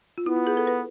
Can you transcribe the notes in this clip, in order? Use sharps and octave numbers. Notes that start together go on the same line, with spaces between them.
F4
B3 E4
F4
G#4
A4
B4